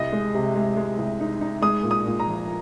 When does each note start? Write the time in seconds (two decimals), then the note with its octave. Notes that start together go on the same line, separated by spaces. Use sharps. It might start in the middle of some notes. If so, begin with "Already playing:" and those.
Already playing: C2 D#5
0.12 G#3
0.35 C3
0.56 G#3
0.77 G#3
0.98 C2
1.20 D#4
1.41 D#4
1.62 G#3 D#6
1.83 A#2
1.91 D#6
2.06 A#2
2.20 A#5
2.27 F3